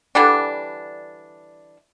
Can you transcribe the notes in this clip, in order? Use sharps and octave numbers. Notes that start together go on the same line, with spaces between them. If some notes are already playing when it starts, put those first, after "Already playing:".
D3 E3 G3 D4